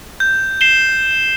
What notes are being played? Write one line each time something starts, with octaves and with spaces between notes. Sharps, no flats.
G6
C7 E7 G7